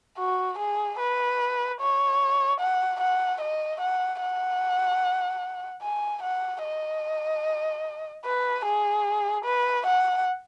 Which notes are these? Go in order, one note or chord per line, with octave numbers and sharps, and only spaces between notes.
F#4
G#4
B4
C#5
F#5
F#5
D#5
F#5
F#5
G#5
F#5
D#5
B4
G#4
B4
F#5